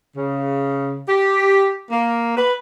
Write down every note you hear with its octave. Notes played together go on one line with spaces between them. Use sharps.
C#3
G4
A#3
B4